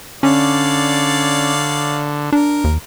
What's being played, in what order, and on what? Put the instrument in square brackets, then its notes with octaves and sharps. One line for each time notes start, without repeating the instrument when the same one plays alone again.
[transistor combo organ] D3 [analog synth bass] C#4 [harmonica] C#5 D5 F5
[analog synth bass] D4 [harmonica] A#4
[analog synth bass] D#2